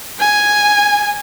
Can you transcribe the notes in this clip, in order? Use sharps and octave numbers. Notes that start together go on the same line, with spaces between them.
G#5